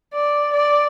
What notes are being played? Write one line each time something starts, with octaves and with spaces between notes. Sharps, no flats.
D5
D5